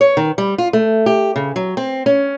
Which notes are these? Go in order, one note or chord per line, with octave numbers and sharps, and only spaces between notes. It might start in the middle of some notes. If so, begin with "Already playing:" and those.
C#5
D#3
G3
F4
A3
G4
C#3
F#3
C4
C#4